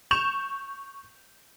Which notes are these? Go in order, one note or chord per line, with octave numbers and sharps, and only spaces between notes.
C#6 G6 E7 F7